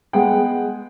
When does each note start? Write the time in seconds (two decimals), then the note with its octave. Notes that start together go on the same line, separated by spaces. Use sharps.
0.13 G#3 B3 G#4 F#5 G5